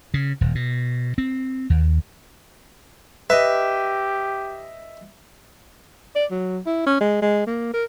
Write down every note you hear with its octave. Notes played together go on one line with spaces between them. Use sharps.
C#3
D#1
B2
C4
D#2
G4 B4 D#5 E5
D5
F#3
E4
C#4
G#3
G#3
A#3
A#4